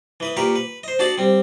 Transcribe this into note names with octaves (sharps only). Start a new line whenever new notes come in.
E3 B4 D#6
A#2 G4 A#4 B4 C#6
B4
C5 D#5
D4 F#4 G#4 F#5 A5
G3 C4